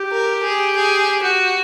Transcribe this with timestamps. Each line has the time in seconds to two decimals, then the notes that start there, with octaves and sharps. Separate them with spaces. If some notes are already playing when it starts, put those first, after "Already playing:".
Already playing: G4
0.12 A#4
0.43 G#4
0.76 G#4
1.23 F#4